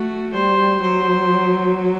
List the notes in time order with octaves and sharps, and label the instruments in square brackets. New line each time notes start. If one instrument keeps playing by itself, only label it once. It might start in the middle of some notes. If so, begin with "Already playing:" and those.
Already playing: [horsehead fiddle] A3 [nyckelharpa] F#4
[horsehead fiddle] G3 [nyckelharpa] C5
[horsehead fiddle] F#3 [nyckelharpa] C5